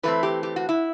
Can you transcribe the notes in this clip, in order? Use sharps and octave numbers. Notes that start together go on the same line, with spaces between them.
E3 A3 C4 B4
G4
G4
F#4
E4